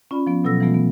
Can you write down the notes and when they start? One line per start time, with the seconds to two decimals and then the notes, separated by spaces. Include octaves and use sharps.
0.11 C#4 F4 D5 B5
0.27 F3 B3
0.44 B2 F#3 A4 E6 A#6
0.60 E3 F3 G#3 A3 B3 F4
0.74 B3